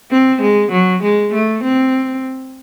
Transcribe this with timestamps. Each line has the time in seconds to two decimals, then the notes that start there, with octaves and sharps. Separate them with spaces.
0.11 C4
0.42 G#3
0.71 F#3
1.03 G#3
1.34 A3
1.63 C4